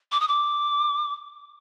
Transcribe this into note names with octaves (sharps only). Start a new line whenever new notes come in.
D6
D#6
D6